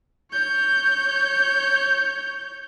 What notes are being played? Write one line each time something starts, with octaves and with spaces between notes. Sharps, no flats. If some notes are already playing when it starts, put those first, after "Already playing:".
C#5 G6